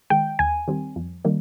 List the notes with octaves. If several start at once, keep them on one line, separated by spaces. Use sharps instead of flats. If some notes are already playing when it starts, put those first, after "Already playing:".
D#3 G#3 G5
D#2 G#5
D#3 G3 C4
F2
D#3 G3 A#3